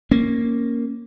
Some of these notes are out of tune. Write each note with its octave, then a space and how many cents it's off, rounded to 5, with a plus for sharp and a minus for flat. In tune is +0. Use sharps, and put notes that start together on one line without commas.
A#3 +0 C#4 -10